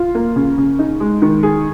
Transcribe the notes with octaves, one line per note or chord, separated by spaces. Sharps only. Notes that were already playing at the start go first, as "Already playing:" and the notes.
Already playing: F4
A#3
C#3
C#3
D#4
G#3
D#3
G#4